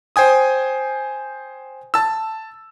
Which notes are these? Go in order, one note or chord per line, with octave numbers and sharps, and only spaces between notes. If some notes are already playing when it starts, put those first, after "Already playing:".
C5 G5 G#5 D#6
A5 E6